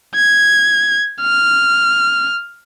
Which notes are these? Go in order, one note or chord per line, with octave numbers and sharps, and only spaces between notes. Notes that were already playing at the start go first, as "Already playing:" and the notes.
G#6
F6